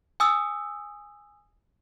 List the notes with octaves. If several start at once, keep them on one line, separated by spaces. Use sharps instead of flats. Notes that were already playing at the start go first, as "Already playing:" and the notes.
G#5 D#6 E6